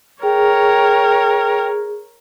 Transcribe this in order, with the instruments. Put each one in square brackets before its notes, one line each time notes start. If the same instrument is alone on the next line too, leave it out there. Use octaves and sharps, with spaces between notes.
[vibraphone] G#4 [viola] A#4 C#5 [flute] G5